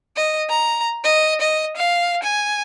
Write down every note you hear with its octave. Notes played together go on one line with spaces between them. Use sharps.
D#5
A#5
D#5
D#5
F5
G#5